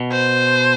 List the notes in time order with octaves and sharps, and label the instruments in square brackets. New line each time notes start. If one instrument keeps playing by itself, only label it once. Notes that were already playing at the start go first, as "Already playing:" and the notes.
Already playing: [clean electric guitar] B2
[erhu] C5